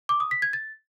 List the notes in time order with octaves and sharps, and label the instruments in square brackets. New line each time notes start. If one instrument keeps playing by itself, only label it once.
[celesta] D6
D#6
B6
G#6
A6